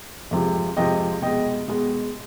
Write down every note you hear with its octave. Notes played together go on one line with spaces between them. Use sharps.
F2 C3 F3 G#3
F2 C3 F3 G#3 D#5 G5
B2 G#3 D#5 G5
B2 G#3